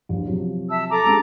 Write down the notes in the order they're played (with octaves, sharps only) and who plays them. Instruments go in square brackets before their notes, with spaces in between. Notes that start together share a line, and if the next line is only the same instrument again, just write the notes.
[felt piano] A#1 E2 G2
C3 F3 F#3
[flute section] E5 A5 E6
A4 A#5 D6
[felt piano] G3 G#3 D4